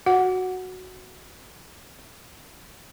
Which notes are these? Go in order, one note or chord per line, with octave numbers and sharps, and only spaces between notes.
F#4 F#5